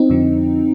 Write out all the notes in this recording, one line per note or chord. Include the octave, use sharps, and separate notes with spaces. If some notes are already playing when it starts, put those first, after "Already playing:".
Already playing: C4 D#4
F2 D3 F3